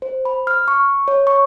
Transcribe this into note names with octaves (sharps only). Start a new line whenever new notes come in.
C5
B5
F6
C#6
C#5
C#6